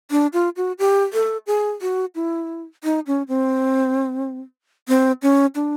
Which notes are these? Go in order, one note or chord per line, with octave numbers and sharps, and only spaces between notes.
D4
F4
F#4
G4
A4
G#4
F#4
E4
D#4
C#4
C4
C4
C#4
D4